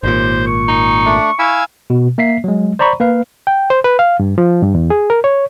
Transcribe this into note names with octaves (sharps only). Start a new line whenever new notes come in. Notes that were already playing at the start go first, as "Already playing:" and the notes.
G#1 D#2 A#2 C5
C#6
D#4
A3 D4 D5
E4 F5 G#5 E6
B2
A#3 E5 B6 C7
F#3 G#3
C5 D5 A#5 B5 C#6
A#3 B4 F5
G5
C5
B4
F5
G2
F3
G2
E2
G#4
A#4
C#5